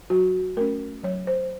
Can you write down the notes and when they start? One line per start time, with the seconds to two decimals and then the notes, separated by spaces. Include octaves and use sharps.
0.10 F#3 F#4
0.57 A3 C#4 A#4
1.03 F#3 C#5
1.27 C5